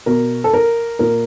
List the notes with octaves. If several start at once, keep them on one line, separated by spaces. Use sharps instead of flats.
B2 A#4
A4
A#4
A#2 A#4